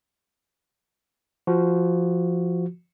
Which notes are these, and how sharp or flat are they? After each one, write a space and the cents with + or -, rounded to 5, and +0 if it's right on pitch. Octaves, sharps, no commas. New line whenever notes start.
F3 -10 F#4 +0